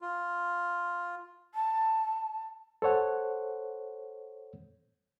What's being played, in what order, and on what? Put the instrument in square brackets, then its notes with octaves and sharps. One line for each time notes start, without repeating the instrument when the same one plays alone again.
[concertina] F4
[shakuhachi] A5
[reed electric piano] A4 C5 C#5 F#5